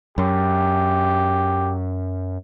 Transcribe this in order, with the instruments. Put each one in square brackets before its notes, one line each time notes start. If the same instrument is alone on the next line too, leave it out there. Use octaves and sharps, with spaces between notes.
[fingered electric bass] F#2 [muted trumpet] G4